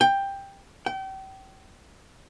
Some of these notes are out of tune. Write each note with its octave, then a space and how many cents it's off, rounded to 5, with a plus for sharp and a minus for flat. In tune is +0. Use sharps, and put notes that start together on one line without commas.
G5 +10
G5 -35